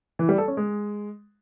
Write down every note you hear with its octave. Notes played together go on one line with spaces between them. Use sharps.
E3
G3
A4
C#4
G#3